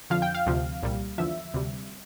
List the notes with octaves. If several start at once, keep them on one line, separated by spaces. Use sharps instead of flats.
F2 D3 F3 F5
G5
F5
D2 C3 F3
C2 A#2 G3
E2 D3 F3 E5
D2 C3 G3